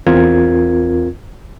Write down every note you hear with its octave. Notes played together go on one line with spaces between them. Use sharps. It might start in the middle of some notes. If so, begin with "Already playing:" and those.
E2 C4 F4 A#4 G#6